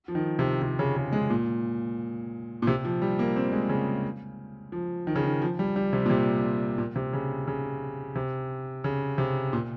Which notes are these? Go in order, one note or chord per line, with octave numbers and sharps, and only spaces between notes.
F3
D#3
C3
C3
C#3
C#3
G#3
A#2
A#2
C3
F3
G3
A#3
C4
G#3
C#3
F3
D#3
C#3
D#3
F3
G3
G3
C3
A#2
C3
A#2
C3
C#3
C#3
C3
C#3
C3
A#2